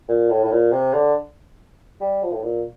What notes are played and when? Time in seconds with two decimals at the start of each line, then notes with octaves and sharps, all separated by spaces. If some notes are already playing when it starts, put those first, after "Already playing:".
0.08 A#2
0.30 A2
0.44 A2
0.52 A#2
0.72 C3
0.94 D3
2.00 G3
2.23 F3
2.33 A2
2.43 A#2